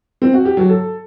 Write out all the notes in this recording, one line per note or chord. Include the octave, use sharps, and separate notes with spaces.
C4
F#4
G4
F#3
A4